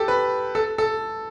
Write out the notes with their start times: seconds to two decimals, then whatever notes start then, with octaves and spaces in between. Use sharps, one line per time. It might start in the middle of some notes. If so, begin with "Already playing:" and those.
Already playing: G4 A4
0.08 B4
0.55 A4
0.78 A4